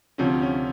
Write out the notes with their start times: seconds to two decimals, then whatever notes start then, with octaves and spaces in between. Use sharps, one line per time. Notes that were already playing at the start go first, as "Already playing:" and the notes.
0.18 D2 C3 F3 C#4
0.42 C#4